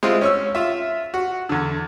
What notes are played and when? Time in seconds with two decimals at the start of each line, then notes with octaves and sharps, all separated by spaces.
0.03 G#3 C4 E4 F4
0.21 C#4 C#6 E6
0.55 F4 E5
1.14 F#4
1.49 E2 D3